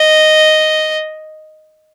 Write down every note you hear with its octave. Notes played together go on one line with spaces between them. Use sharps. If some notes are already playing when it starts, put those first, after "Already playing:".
Already playing: D#5